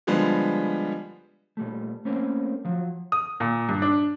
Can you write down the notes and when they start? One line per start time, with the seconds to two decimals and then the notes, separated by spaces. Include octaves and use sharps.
0.07 D3 F3 G3 G#3 B3
1.57 A#2 G3 A3
2.05 A3 A#3 C4 C#4
2.65 F3 F#3
3.12 D#6
3.40 A#2
3.69 G2
3.82 D4